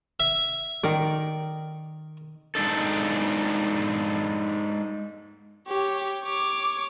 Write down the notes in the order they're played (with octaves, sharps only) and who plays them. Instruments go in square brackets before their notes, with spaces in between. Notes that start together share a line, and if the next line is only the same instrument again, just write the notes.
[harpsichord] E5
[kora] D#3 A#4 D5
[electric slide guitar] G#3 D4 D#4 A4
[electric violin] G4 C#5
C#5 D6